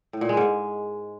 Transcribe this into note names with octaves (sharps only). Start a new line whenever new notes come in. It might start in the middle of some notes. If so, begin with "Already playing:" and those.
A2
A#2
G#3
G#2